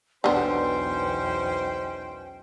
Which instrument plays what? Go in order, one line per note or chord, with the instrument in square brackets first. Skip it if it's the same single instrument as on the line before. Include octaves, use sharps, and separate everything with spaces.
[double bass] B1 E2 [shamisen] D3 B3 [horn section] C#4 D#4 C5 [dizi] G5